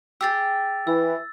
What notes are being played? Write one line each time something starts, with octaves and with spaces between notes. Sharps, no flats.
G4 G#4 G5 E6 A6
E3 E6